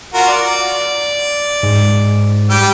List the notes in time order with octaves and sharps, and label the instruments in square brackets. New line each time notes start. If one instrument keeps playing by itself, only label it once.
[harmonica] F4 F#4 A#4
D5
[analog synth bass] G#2
[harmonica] G3 G4